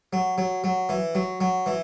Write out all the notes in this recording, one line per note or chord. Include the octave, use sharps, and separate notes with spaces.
F#3
F#3
F#3
E3
F#3
F#3
E3